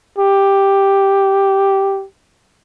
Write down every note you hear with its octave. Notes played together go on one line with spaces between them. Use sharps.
G4